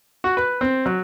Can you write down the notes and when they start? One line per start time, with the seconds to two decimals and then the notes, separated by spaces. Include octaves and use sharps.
0.24 F#4
0.37 B4
0.61 C4
0.86 F#3